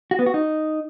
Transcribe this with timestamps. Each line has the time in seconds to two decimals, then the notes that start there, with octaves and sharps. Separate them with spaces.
0.11 F#4
0.19 B3
0.26 F#4
0.34 D#4